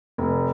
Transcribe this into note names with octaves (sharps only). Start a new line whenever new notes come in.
F1